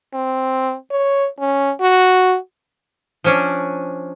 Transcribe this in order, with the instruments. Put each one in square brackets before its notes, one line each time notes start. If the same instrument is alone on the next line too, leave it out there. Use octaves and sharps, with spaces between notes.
[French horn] C4
C#5
C#4
F#4
[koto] F3 C#4 D4